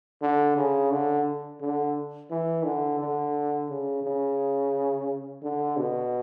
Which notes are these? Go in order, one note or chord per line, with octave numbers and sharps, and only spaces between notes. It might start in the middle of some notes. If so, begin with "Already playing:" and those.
D3
C#3
D3
D3
E3
D3
D3
C#3
C#3
D3
B2